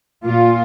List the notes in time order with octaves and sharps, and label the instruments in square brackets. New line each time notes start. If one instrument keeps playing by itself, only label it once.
[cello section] A#2 F4